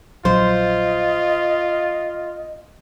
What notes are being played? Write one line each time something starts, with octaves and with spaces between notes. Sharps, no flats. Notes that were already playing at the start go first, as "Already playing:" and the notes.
A#1 F#3 F4 C5 D#5